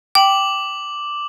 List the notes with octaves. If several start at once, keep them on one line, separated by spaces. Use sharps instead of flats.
G5 D6 F#7